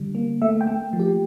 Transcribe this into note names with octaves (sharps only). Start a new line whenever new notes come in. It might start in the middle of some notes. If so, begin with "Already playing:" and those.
Already playing: D3 G3
A#3
A3 E5
G5
A3
F3
G4